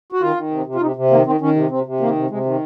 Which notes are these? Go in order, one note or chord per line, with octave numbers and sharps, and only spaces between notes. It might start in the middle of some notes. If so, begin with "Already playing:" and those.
F#4
D#3 F4
D#3
C3
C3
F4
C3 D#4
C3
D#3 A#3
D#3 C4
D#3 C#4
C3
C3 C4
C3
D#3 A#3
C3
C3 G#3
D#3